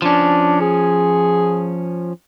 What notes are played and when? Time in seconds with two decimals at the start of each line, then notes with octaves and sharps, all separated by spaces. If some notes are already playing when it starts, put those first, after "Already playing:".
0.02 F3 C#4 D4
0.61 G#4